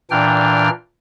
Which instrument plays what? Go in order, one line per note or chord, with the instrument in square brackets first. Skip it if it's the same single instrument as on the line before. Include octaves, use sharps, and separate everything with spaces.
[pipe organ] A#2 E3 D4 G5 F6